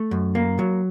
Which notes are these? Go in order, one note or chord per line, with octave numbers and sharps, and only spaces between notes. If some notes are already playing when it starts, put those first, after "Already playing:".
Already playing: A3
F#2
A#3
F#3